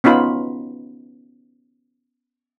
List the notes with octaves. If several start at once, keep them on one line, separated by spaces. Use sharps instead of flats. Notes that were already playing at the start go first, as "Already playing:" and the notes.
B3 C#4 D#4 F4 B5